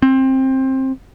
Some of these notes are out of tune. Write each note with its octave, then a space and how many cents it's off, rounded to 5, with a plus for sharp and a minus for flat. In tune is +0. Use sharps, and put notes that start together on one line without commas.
C4 +20